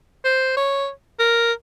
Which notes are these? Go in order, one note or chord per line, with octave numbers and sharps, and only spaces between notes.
C5
C#5
A#4